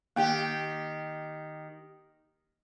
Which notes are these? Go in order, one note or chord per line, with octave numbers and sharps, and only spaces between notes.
D#3 A#3 G4 G5